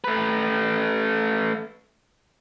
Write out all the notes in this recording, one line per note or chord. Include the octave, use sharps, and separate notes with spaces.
A3 B4